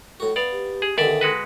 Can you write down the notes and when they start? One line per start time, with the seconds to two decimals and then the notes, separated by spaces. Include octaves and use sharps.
0.20 A2 F#4
0.36 B3 D5 F5
0.52 G4
0.82 G#4
0.98 E2 D3 D#3 A#3 D5 E5
1.21 G#3 F#4 B4